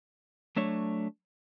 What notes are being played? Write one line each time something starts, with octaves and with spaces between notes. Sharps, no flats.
F#3 A3 D4 C#5